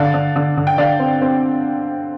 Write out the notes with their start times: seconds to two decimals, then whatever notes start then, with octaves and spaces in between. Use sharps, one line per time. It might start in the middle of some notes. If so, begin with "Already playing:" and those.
Already playing: D3 D5 F5
0.14 D3
0.36 D3
0.57 D3
0.67 G5
0.78 D3 D5 F5
1.00 C4
1.21 C4